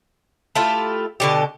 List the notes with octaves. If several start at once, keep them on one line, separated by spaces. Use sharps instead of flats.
A3 E4 F4 G4
B2 D3 G4